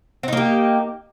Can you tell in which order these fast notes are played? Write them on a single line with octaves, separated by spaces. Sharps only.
C4 D#4 A#3 G4